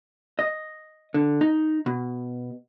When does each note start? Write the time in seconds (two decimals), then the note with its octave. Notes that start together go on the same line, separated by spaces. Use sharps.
0.39 D#5
1.14 D3
1.41 D#4
1.86 B2